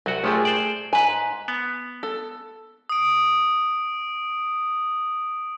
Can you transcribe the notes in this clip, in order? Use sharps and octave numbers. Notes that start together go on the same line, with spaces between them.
C2 F#3 F#4
A#1 F3 F#3 A3 G4 G#4
C5 D5
G#2 B4 G#5
B3
A4
D#6 D7